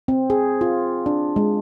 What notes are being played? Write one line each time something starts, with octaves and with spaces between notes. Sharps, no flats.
C4
G#4
F4
D4
G#3